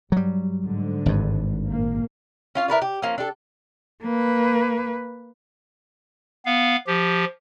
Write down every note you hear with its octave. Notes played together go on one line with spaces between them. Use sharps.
G2 F#3 G3
G#2 D3
G#1 G2
A#1 A#3
C#4 F4 F5
E4 A#4 B4 D5
G4
F3 A#3 C#4
D4 G4 A4
A#3 B4
B3 F5
F3 G4